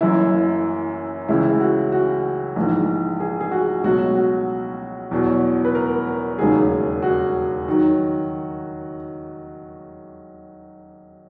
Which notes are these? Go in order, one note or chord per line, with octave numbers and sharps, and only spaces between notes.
F#1 F#2 E3 E4
C#2 C#3 E3 E4
F#4
F#4
A#1 G#2 E3
G#4
G#4
F#4
C#2 B2 F#3 F#4
F#4
E2 B2 F#3
B4
A#4
A#4
E1 D#2 C#3 F#3 G#4
F#4
D#3 F#3